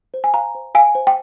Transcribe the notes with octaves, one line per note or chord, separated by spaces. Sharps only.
C5
G#5
F5 A#5
C5
F5 G#5
C5
G5